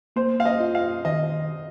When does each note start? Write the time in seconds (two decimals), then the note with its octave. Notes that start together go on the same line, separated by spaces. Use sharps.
0.16 A#3 C5
0.40 F5
0.45 D#5
0.60 F4
0.75 F5
1.05 D#3 D#5